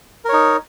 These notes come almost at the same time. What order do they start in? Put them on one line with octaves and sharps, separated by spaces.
A#4 C#5 D#4